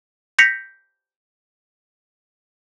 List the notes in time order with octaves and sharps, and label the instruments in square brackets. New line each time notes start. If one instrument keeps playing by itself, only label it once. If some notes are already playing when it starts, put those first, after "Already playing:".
[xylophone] G6 A#6 B6 C#7 F7